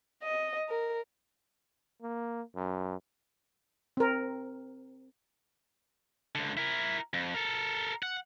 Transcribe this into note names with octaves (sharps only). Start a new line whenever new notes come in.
D#5
A#4
A#3
F#2
C4 A#4
C#2 D3
E4 A#4
F2
A4 A#4
F#5